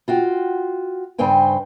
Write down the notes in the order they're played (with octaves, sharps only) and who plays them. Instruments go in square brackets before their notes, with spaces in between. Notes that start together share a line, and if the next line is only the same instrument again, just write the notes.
[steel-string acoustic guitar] F4 F#4 G5
G2 C#3 C5 G5 G#5